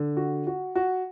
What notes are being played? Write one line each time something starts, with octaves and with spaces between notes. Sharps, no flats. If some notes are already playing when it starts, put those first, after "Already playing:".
Already playing: D3
F#4
F#4
F#4